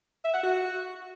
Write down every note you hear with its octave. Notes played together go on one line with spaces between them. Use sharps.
E5
F#5
F#4